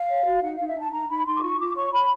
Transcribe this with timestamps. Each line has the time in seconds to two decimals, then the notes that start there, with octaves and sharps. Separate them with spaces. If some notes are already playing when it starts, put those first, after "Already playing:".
Already playing: F5
0.09 C#5
0.25 F#4
0.42 D#4 F#5
0.55 D#4 F5
0.67 E5
0.76 D#4 A5
0.92 D#4 A#5
1.09 D#4 B5
1.26 D#4 C6
1.37 D6
1.43 F4 C#6
1.59 F4 D6
1.76 C#5 C#6
1.93 C#5 B5